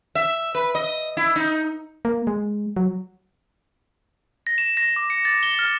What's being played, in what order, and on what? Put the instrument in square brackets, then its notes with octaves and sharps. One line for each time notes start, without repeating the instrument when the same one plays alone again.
[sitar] E5
B4
D#5
E4
D#4
[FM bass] A#3
G#3
F#3
[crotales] A#6
E7
A#6
D6
C#7
A6
G7
F6